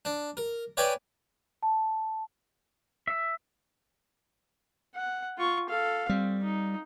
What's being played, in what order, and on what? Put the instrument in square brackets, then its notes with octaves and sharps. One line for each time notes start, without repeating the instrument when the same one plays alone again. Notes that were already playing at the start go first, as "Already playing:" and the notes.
[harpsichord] D4
A#4
B4 C#5 D5 E5 G5 G#5
[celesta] A5
[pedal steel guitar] E5
[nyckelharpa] F#5
F4 C#6
A4 F5
[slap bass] G3 [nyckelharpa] C4
[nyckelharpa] D#4